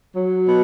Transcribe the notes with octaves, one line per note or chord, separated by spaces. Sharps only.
F#3
B2